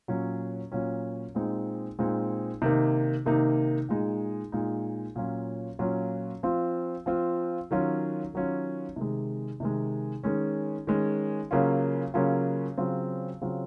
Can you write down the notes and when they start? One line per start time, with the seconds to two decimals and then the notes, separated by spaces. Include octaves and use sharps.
0.08 A#2 F#3 C#4
0.72 A#2 F#3 C#4
1.35 A#2 G#3 C4 D#4
1.99 A#2 G#3 C4 D#4
2.62 C3 D#3 A#3 D#4
3.26 C3 D#3 A#3 D#4
3.89 A#2 G#3 D#4
4.52 A#2 G#3 D#4
5.16 A#2 F#3 C#4 F4
5.79 A#2 F#3 C#4 F4
6.43 F3 C4 F4
7.06 F3 C4 F4
7.71 D#3 F#3 C#4 F4
8.34 D#3 F#3 C#4 F4
8.96 C3 D#3 G#3
9.60 C3 D#3 G#3
10.24 D#3 G#3 C#4
10.87 D#3 G#3 C#4
11.51 C#3 F#3 A#3 C#4 F4
12.14 C#3 F#3 A#3 C#4 F4
12.77 C#3 F#3 C4 F4
13.41 C#3 F#3 C4 F4